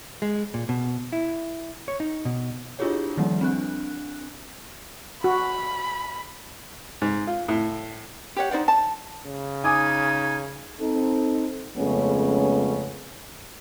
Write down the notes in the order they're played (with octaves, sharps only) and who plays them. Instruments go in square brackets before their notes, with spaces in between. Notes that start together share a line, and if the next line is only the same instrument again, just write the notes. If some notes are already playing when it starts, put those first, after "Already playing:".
[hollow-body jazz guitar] G#3
A#2
B2
E4
C#5
D#4
B2
[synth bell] D4 E4 F4 G4 G#4 C#5
D#3 F3 G3 A#3
C4 D4 F#6
[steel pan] F#4 [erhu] B5
[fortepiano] G#2
F4
A2
[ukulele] G4 C#5 F#5
D#4 C5 D5 F#5
A5
[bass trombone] C#3
[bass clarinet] D#4 [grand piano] G#5 D6 D#6 [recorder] G#6
[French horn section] C4 D#4 A4
F2 C#3 G#3 A3 B3 C#4